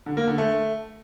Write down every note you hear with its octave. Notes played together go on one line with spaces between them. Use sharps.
D3
A#3
D3
A3